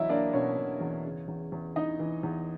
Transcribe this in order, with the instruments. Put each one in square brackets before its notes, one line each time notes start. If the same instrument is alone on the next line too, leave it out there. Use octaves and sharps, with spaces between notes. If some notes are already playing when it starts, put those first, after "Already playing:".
Already playing: [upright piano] E2 F#3 E4 D#5 E5
A#3 D4 D5
B2 C#4 C#5
B2
E2
C#3
E2
E2
E3 D#4 D#5
E3
E2